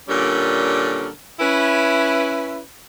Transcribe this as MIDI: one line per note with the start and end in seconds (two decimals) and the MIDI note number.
0.09 1.09 46
0.09 1.09 50
0.09 1.09 55
0.09 1.09 61
0.09 1.09 69
0.09 1.09 70
1.40 2.61 61
1.40 2.61 64
1.40 2.61 71